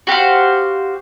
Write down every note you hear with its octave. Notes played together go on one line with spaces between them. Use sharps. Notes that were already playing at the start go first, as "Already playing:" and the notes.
F#4 G4 C5 F5